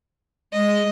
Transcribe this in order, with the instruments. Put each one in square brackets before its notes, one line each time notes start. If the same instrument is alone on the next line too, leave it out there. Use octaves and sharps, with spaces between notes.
[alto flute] G#3 [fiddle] D#5